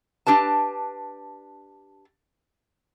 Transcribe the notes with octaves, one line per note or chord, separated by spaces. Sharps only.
D4 G4 B4 A5